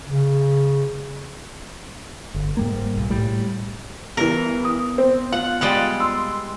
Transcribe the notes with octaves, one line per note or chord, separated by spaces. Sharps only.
C#3
G1
G#2 G3 A#3
B1
A2 G3
E3 G3 B3 A#4
D#6
C4
F4 F#5
G3 G#3 F4 F#5 A6
C6 E6